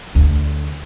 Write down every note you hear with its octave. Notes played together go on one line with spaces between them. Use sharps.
D2